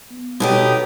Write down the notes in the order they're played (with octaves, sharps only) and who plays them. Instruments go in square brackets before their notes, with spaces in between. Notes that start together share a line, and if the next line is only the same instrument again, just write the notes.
[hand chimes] B3
[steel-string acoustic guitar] B2 D#4 G4 [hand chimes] A4 B4 C#5
[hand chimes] G#6